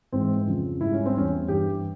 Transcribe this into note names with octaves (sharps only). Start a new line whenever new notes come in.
G#2 E3 G#3 C4
F2 C#3 F3
G#2 G3 E4
C#4
C4
E2 E3 G3 C#4
G2 E3 G3 G4